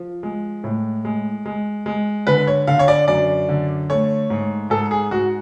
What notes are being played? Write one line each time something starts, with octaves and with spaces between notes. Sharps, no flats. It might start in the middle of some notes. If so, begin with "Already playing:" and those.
Already playing: F3
G#3
A2
G#3
G#3
G#3
D3 B4
C#5
D3 F5
C#5
D5
F#2 D5
D3
A3 C#5
G#2
G#2 A4
G#4
G#2 F#4